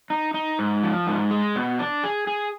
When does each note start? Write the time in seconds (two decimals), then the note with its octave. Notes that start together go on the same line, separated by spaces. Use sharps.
0.10 D#4
0.34 D#4
0.59 G#2
0.83 F3
1.07 G#2
1.31 G#3
1.55 B2
1.79 D4
2.04 G#4
2.27 G#4